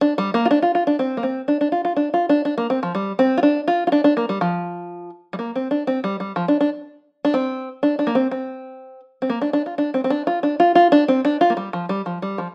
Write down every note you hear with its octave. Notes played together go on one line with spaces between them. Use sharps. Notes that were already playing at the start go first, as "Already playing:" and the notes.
D4
G3
A#3
F4
D4
F4
F4
D4
C4
A#3
C4
D4
D4
F4
F4
D4
F4
D4
D4
A#3
C4
F3
G3
C4
F4
D4
F4
F4
D4
D4
A#3
G3
F3
G3
A#3
C4
D4
C4
G3
G3
F3
D4
D4
D4
C4
D4
D4
A#3
C4
C4
C4
A#3
D4
D4
F4
D4
C4
C4
D4
F4
D4
F4
F4
D4
C4
D4
F4
A#3
G3
F3
G3
F3
G3
F3